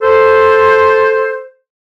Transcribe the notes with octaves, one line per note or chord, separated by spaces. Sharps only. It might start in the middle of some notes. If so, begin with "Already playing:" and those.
A4 C5